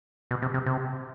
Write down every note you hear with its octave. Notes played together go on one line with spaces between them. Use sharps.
B2
C3
C3
C3